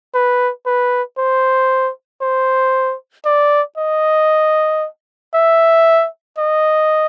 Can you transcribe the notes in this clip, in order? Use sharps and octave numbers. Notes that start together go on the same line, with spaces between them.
B4
B4
C5
C5
D5
D#5
E5
D#5